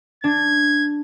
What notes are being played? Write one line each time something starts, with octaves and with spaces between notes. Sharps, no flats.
D4 G#6